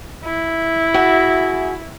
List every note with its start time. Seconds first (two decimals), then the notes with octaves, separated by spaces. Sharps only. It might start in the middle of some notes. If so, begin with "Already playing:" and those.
0.25 E4
0.94 F#4 G#4 E5